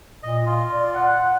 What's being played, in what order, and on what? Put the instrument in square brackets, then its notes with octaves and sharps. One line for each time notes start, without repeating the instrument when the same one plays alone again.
[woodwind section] A#2 [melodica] D#5
[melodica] F4
[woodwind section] D5
F#5